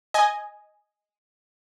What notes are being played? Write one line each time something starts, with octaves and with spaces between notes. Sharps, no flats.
D#5 G#5